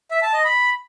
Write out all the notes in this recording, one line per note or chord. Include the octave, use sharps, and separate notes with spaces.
E5
A5
D#5
B5